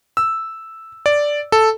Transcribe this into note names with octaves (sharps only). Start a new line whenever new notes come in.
E6
D5
A4